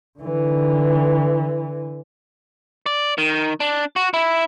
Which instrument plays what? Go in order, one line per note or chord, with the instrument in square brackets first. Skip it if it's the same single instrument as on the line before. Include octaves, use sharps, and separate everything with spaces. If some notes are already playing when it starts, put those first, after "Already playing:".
[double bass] D3 E3
[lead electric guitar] D5
D#3
D4
F#4
E4